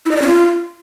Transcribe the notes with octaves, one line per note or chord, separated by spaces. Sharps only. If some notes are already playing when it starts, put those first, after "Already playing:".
E4
D#5
D5
C#4
F4